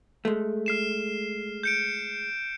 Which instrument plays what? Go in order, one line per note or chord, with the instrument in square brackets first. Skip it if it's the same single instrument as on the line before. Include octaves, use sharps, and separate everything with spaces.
[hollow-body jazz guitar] G#3 A3
[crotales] F6 C7 E7
G6 C#7 D7